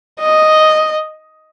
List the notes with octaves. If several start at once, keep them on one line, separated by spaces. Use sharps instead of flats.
D#5